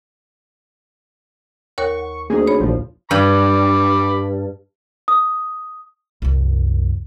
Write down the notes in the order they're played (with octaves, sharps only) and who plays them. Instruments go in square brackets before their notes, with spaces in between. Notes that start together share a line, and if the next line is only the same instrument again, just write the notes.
[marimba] D#2 A#4 C#5 [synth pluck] F#5 [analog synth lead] C#6
[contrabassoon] D2 [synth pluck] A#3 C4 D#4 [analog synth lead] G#4
[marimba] C#5 B5
[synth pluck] A#1 D#2 A#2 [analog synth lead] F3
[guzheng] G2 [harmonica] B5 D6
[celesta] D#6
[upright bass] C2 F#2